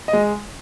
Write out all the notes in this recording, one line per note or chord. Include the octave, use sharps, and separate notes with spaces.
D#5
G#3